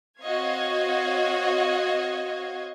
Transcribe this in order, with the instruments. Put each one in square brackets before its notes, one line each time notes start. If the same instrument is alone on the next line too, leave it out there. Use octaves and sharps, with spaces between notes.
[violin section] C4 F#4 C#5 D#5 F5 G#6